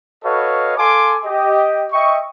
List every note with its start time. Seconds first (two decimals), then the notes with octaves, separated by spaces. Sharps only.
0.24 F#4 A4 B4 C#5 D#5 F5
0.77 A4 F5 G#5 C6 D6
1.24 G4 D#5
1.92 D#5 E5 G5 C#6